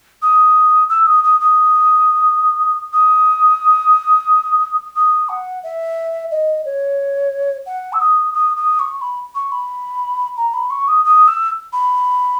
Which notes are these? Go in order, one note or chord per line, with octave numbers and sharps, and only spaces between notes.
D#6
E6
D#6
D#6
D#6
D#6
D#6
F#5
E5
D#5
C#5
F#5
E6
D#6
D#6
D#6
C#6
B5
C#6
B5
A#5
B5
C#6
D#6
D#6
E6
B5